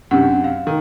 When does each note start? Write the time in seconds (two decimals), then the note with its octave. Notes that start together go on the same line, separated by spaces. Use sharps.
0.11 F#2 C3 D4 F#5
0.44 F5
0.67 D#3